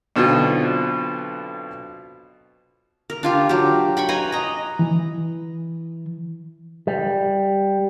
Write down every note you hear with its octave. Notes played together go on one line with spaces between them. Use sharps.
B1 B2 D3 C4 F4
A#4
D4 F4 G4
F#3 G4
G5 B5 C#6
B4 C#5 G#5 A#5
D#5 A#5
E3
G3